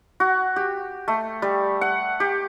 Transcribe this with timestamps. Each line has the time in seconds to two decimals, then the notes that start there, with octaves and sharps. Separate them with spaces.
0.20 F#4
0.56 G4
1.08 A3
1.42 G3
1.81 F#5
2.20 G4